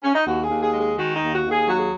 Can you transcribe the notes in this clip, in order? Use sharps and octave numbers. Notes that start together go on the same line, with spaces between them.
C#4
D#4
D#2 F#4
G#4
D#2
G#4
G#3
G#4
D#3 F#4
D#4
D#2
F#4
D#2
G#4
F#3 F#4
G#4